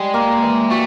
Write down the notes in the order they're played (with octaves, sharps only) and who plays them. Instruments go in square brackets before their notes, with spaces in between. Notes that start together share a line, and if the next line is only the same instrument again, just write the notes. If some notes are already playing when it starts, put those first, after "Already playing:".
Already playing: [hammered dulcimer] G3 [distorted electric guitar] G#3
[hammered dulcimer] A#3
E3
[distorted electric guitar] A3 [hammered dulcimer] F#4